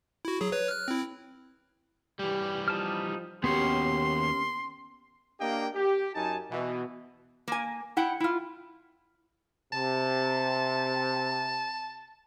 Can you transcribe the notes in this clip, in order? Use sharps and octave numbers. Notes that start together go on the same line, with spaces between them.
E4 F#4
F#3 G#4
B4 C#5
F6 F#6
C4 E4
E3 G3 G4
F3 D#4 A5 F6
D#2 B3 C#4 F#4 G4 C6
A#3 D4 G4 D#5 F5 G5
G4
F#2 D#4 G#5 A5
B2 E3
A#3 G#5
E4 F#5 G5
E4 F4
C3 A5